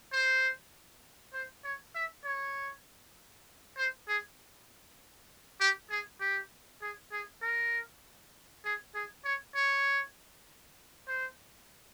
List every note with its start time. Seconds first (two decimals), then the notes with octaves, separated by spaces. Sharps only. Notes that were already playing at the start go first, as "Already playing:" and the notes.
0.12 C5
1.34 C5
1.64 C#5
1.95 E5
2.25 C#5
3.77 C5
4.08 G#4
5.60 G4
5.90 G#4
6.20 G4
6.81 G#4
7.12 G#4
7.42 A#4
8.64 G#4
8.95 G#4
9.25 C#5
9.55 C#5
11.07 C5